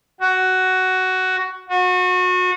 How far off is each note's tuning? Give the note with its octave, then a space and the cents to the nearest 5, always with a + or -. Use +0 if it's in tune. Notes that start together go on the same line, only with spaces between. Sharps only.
F#4 +10
F#4 -30